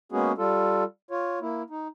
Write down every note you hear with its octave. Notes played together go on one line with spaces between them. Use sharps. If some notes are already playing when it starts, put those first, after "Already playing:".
G#3 A#3 B3 C#4 F#4 G#4
G3 F4 A4
F4 C#5
A#3 E4
D#4